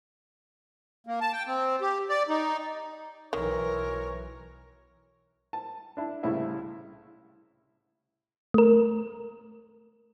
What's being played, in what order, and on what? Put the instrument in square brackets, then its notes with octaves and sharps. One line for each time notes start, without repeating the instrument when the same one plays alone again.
[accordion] A#3
A5
G5
C4
G4
D5
D#4
[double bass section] B1 E3 [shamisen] D#3 [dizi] A#4 [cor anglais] C#5
[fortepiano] A5
D4 E4
C2 A2 C#3 E4 E5
[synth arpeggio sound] A3 A#4